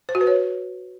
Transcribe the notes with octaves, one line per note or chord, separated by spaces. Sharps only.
C5
F#4
B4
C#5